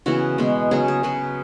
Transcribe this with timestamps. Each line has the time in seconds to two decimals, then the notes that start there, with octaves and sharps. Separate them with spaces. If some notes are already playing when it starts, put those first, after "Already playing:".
0.06 C#3 E3 B3 F#4
0.38 B2 G#3 B3
0.71 C#3 F#3 B3 G#4
0.88 G#4
1.03 C#3 F#3 B3 B4